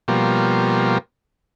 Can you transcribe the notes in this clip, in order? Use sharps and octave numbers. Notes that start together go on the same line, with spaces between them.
B2 F3 G3 A#3